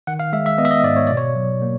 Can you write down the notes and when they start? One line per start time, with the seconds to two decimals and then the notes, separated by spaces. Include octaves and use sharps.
0.07 D#3 F#5
0.20 F5
0.33 G#3 E5
0.46 E5
0.58 B3 D#5
0.65 E5
0.71 D#5
0.84 G#2 D5
0.96 C#5
1.07 B2 D5
1.17 C#5
1.35 F#3
1.62 A#3